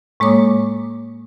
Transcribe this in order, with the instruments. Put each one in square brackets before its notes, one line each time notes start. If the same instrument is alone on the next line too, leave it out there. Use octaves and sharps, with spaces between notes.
[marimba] A2 G#3 A#3 C#5 D6 D#6